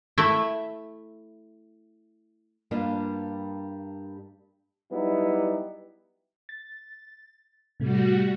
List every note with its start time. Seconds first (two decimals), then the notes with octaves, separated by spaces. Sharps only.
0.18 A3 E4 E5
2.71 G2 G3 A#3 D4 F4
4.91 F#3 G3 B3 D#4 E4 G4
6.49 A6
7.80 A2 C3 G3 A3 F#4